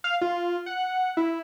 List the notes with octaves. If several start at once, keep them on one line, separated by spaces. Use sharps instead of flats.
F5
F4
F#5
E4